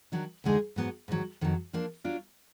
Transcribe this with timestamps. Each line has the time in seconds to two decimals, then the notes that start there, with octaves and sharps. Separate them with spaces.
0.12 D#3 F#3 D4
0.44 D2 D3 G#3 D#4 G#4
0.76 G#2 F#3 B3
1.08 G#2 D#3 F#3
1.41 F2 D#3 F#3
1.73 F3 A#3 D4
2.04 F#3 D4 F4